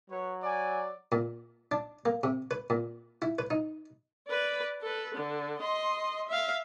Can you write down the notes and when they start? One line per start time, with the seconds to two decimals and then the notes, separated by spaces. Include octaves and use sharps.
0.10 F#3 B4 C#5
0.43 D5 G#5
1.12 A#2
1.72 D4
2.06 A#3
2.23 C3
2.51 B4
2.70 A#2
3.22 E4
3.39 B4
3.50 D#4
4.28 B4 D5
4.82 A4 B4
5.15 D3
5.59 D#5 C6
6.28 E5 F5